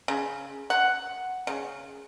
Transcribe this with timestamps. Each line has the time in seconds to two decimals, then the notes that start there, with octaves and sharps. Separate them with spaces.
0.08 C#3
0.70 F#5
1.47 C#3